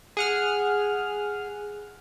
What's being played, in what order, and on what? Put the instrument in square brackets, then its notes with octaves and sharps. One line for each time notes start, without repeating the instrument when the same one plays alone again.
[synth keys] G#4 F#5 F6